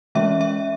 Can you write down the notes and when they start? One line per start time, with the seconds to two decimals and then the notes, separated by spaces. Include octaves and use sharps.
0.15 E3 G#3 C#4 E5
0.41 E5